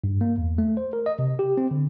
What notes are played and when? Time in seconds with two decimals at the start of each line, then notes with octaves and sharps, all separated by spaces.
0.04 G2
0.21 A#3
0.38 E2
0.58 A3
0.77 C5
0.93 A#4
1.06 D#5
1.19 C3
1.39 G4
1.57 C4
1.71 D3